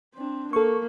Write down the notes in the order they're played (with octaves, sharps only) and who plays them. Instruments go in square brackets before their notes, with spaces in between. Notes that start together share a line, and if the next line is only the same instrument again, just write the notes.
[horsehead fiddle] C4 D4
[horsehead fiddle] A#3 [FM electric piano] A4 C#6